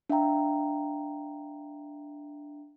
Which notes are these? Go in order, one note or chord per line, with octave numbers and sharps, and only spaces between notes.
D4 E5 F5 G5 A#5